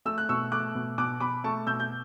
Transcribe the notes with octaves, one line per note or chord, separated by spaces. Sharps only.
A3 E6
F#6
B2 C#6 E6
A3 D6 F#6
B2
B2 D6 F#6
B2 B5 D6
A3 A5 C#6
B2 E6 G6
G6